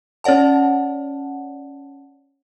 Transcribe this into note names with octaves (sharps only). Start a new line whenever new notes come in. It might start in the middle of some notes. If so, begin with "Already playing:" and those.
C#4 C#5 D5 F#5 A5